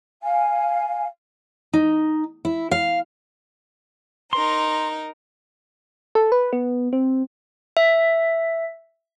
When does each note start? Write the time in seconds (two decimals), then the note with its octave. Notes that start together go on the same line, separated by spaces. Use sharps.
0.22 F5 G#5
1.73 D#4
2.45 E4
2.71 F5
4.33 D#4 A#4 C6
6.15 A4
6.32 B4
6.53 B3
6.93 C4
7.77 E5